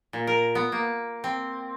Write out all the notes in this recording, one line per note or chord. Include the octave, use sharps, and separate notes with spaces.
A#2
A#4
B3
A#3
C4